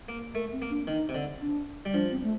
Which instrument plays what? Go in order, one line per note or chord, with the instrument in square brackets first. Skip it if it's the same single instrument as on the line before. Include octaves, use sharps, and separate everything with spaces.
[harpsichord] A#3
[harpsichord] A3 [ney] A#4
[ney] C4
[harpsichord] A#3
[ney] D4
[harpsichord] D#3 [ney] D#4
[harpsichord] C3
D3
[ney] D4
[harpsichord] G3
[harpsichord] F3 [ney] D4
[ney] C4
A3